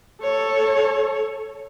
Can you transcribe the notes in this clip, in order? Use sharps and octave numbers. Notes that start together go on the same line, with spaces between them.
A4 C#5